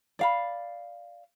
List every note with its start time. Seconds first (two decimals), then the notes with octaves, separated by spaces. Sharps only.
0.19 D5 F5 B5